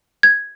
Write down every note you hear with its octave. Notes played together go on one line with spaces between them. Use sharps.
G#6